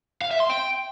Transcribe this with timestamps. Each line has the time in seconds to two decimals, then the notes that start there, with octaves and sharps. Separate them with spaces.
0.21 F5
0.31 E5
0.40 C6
0.50 G5